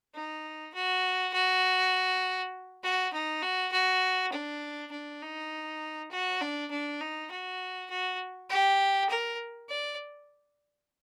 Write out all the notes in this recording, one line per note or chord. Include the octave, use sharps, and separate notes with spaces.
D#4
F#4
F#4
F#4
D#4
F#4
F#4
D4
D4
D#4
F#4
D4
D4
D#4
F#4
F#4
G4
A#4
D5